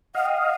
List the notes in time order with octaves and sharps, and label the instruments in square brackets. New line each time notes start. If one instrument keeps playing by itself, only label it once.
[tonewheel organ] D#5 F5 [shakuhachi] F#5
[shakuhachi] G5
F#5